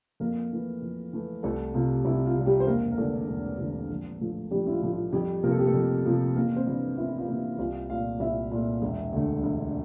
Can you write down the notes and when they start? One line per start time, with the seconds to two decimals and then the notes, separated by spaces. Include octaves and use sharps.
0.20 F2 A#3 A#4
0.51 E3 A3
0.82 F2
1.13 E3 A3
1.43 C2 A3 A4
1.74 C3 G3 F4
2.05 C2 E4
2.26 F4
2.35 C3 G3
2.46 G3 G4
2.60 C5
2.67 E1 A#3 A#4
2.92 A#4
2.97 E2 D3 A3 A4
3.28 E1
3.59 E2 D3 A3
3.90 A#1
4.21 A2 F3 A3
4.51 A#1 G3 G4
4.67 E4
4.71 F4
4.82 A2 F3 A3
4.92 F4
5.12 F2 G3 G4
5.43 C3 F3 A#3 A#4
5.51 A4
5.59 G4
5.66 A3 A4
5.74 F2
6.05 C3 F3 A#3
6.36 A1 A#3 A#4
6.56 C4 C5
6.67 G2 E3 A#3
6.97 A1 E4 E5
7.18 F4 F5
7.28 G2 E3 A#3
7.58 C2 F4 F5
7.89 A#2 A3 F4 F5
8.20 C2 E4 E5
8.51 A#2 A3
8.82 E1
9.13 D2 D3 A3
9.43 E1